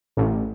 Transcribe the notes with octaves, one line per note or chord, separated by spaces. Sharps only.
A1